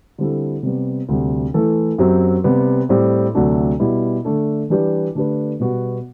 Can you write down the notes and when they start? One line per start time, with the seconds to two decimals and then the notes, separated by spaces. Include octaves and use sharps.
0.18 D3 G3 C4 E4 A4
0.63 C3 G3 B3
1.09 D2 C3 G3
1.54 E3 A3 E4 A4
1.98 F#2 F#3 C4 G4
2.44 C3 G3 B3
2.89 A2 G3 C4
3.35 D2 C3 F#3 A3 D4
3.80 B2 G3 B3 E4
4.25 D3 A3 D4 A4
4.70 E3 G3 D4 G4 B4
5.15 D3 A3 D4 G4 B4
5.60 B2 G3 B3 F#4